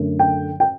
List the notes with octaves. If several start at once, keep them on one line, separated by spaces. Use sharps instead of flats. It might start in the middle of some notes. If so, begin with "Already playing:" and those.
Already playing: F#2 D3 A3
G5
G5